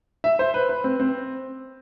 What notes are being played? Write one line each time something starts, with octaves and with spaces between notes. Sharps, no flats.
E5
C5
B4
B4
C4
C4